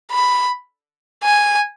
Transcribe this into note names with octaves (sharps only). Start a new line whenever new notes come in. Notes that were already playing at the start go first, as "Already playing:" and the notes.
B5
G#5